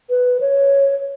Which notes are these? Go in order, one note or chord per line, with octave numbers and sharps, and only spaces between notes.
B4
C#5